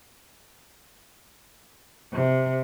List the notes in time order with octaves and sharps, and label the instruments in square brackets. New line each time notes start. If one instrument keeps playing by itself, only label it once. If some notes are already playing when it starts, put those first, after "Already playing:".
[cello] C3